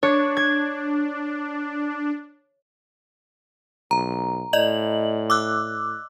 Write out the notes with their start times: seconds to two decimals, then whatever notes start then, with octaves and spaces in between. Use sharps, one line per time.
0.03 D4 C#5
0.37 G#6
3.91 B1 A#5
4.53 A2 D5 D#5 F#7
5.30 D6 E6 F#6